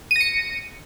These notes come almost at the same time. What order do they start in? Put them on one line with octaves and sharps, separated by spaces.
D#7 A#6 C#7